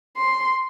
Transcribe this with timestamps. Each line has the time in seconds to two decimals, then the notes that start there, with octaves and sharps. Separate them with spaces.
0.17 C6